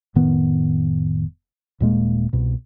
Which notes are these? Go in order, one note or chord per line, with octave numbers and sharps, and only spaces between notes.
F1 A2 D#3 B3
D#1 A#2 G#3 A#3
C2 B2